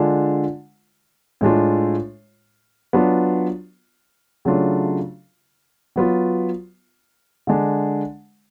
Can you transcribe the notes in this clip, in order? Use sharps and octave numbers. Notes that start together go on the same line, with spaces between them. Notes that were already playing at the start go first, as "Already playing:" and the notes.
Already playing: D3 G#3 D4 F4
A2 G#3 D4 F4
F#3 B3 D4 F4
C#3 F#3 A3 D4 F4
F#3 B3 F4
D3 G#3 D4